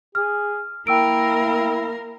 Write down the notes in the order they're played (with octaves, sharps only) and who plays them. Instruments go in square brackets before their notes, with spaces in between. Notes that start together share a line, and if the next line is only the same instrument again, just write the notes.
[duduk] G#4 [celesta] F6
[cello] A#3 A#4 [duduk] E4 [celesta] G5 E6 D7